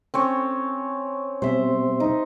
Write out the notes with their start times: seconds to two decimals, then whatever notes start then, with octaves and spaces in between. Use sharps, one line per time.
0.14 C4 C#4 C#5
1.42 B2 G3 C4 C5 E5
2.00 D#4